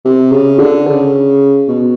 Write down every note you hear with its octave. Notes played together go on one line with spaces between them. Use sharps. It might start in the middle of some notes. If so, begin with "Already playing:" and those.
C3
C#3
D3
C#3
B2